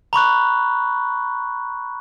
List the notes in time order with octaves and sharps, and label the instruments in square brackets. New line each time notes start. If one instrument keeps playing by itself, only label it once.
[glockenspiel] A#5 B5 C#6 F#6